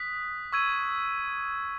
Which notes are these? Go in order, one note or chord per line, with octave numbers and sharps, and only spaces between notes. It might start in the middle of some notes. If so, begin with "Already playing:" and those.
Already playing: D#6 F#6 B6
C#6 E6 G#6 D#7